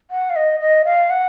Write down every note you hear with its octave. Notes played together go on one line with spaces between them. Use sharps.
F#5
F5
D#5
D#5
F5
F#5